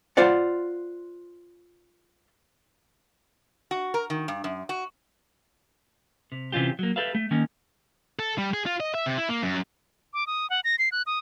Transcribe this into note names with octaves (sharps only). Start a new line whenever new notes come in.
F4 C5 D5 F#5
F#4
A#4
D#3
G2
F#2
F#4
C3
C3 E3 C#4 F4 G4
F#3 A#3
G4 A4 B4 E5 F5
A3
D#3 A#3 C#4 D#4
A4
G3
G#4
F4
D#5
E5
C3
E4
A#3
F#2
D6
D#6
F#5
A#6
C7
F#6
D#6